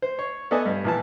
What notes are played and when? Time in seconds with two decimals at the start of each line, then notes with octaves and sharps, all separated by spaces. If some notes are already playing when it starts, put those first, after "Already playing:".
0.02 C5
0.19 C#5
0.51 B3 A4 D5 D#5 G#5 A5
0.66 G2
0.85 A#1 E3 A5